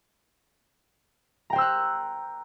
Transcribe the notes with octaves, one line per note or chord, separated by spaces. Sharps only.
C5 G5 A#5 E6 F#6